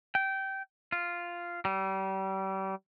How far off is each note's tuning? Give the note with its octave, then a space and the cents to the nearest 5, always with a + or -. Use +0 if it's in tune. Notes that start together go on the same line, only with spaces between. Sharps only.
G5 -20
F4 -5
G3 -35